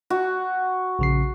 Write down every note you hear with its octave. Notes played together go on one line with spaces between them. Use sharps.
F#4
A#1 C#3 C7